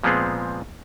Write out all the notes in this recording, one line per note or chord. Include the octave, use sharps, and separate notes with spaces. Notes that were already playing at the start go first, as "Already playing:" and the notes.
A#2 F3 G#3 B3 C4 G#4